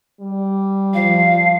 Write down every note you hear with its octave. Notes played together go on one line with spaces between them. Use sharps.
G3
F3 F5